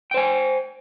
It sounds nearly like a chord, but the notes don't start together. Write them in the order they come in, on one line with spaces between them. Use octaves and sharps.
G5 C5 G#5